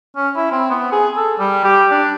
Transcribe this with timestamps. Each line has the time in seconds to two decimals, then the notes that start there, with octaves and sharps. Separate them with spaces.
0.16 C#4
0.36 E4
0.52 C4
0.70 B3
0.92 G#4
1.17 A4
1.39 G3
1.64 G4
1.91 D4